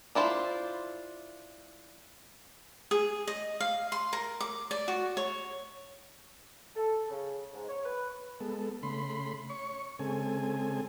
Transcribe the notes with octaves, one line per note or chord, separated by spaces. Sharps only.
D4 E4 F4 C5
G#4
D#5
F5
C6
A#4
D6
D5
F#4
C#5
A4
C#3
G#2
C#5
B4
G#3 B3 A4
C#3 A3 B5 C6
C#5 C#6
C#3 G#3 C4 A4 G#5